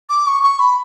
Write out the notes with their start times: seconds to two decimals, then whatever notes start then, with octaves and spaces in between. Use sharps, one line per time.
0.09 D6
0.27 C#6
0.43 C#6
0.59 B5